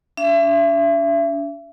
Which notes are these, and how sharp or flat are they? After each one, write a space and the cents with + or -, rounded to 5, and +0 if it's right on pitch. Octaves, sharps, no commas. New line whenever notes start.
D4 -40 E5 +35